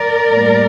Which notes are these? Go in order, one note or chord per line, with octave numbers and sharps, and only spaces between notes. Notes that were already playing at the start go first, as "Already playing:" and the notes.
Already playing: A#4 D5
A2 G3 A#3